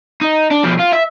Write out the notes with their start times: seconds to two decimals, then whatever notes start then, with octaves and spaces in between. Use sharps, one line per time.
0.21 D#4
0.51 D4
0.64 B2 F3
0.80 F4
0.93 E5